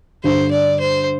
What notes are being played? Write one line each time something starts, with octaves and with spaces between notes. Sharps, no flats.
G2 D3 G3 C5
D5
C5